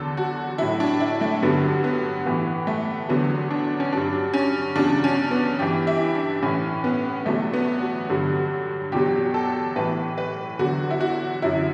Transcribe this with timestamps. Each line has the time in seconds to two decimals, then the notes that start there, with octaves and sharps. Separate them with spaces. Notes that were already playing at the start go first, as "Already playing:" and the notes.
Already playing: E2 D3 F#3 A4
0.17 F#4
0.58 A2 F#3 E4
0.80 D4
1.01 E4
1.21 A3
1.42 G2 D3 F#3 B3
1.84 B3
2.26 A2 E3 B3
2.67 A3
3.09 E2 D3 F#3 B3
3.51 D4
3.80 C#4
3.92 G2 F#3 D4
4.33 C#4
4.76 E2 C#3 F#3 D4
5.04 C#4
5.31 B3
5.59 G2 E3 G4
5.87 E4
6.15 D4
6.43 A2 E3 C#4
6.84 B3
7.26 E2 B2 F#3 A3
7.53 B3
7.81 F#4
8.10 G2 D3 F#3
8.92 E2 B2 F#3 G4
9.34 A4
9.76 A2 E3 B4
10.18 B4
10.59 E2 D3 F#3 F#4
10.91 E4
11.00 F#4
11.42 F#2 D3 F#3 E4